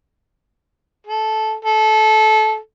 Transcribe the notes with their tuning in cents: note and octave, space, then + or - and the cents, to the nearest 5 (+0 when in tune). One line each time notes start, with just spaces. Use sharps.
A4 -15
A4 -20